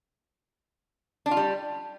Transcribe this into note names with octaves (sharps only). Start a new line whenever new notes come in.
D4
F4
G3